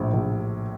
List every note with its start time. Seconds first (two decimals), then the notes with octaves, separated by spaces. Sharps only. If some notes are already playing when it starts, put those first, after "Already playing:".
Already playing: A#1 A2
0.14 A#1